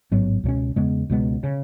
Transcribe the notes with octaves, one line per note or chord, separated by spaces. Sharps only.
A1 G#2 F#3 B3
C#2 B2 F#3 C#4
E2 C#3 G#3 B3
C#2 B2 G#3 B3
C#3